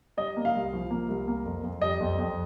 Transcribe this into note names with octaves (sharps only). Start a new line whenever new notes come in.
G3 D#5
A#3
F5
C2
F3
A#3
C2
A#3
F2
F2
G3 D#5
F2
F2